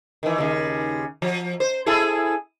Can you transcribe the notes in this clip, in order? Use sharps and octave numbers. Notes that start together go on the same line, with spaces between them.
D#3 E3
D#2 C#3
F3
C5
E4 G#4 A4